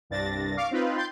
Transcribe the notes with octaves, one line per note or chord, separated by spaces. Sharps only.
C2 G2 D4 A6 A#6
F5 C#6 D6
C4 D#4 F4 B4
G5 C6 G6 A6